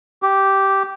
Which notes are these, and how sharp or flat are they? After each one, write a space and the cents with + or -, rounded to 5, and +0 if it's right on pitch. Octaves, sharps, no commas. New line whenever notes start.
G4 -10